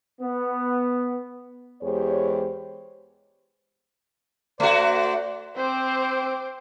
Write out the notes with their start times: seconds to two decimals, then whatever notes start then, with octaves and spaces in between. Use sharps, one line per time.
0.21 B3
1.82 E2 G#3 G4 C5 C#5
4.60 A3 F#4 C5 D5
5.57 C4 C5 D6